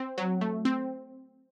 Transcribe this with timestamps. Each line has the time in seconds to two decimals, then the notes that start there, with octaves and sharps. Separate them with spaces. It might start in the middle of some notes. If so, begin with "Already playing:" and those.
Already playing: C4
0.18 F#3
0.41 A3
0.65 C4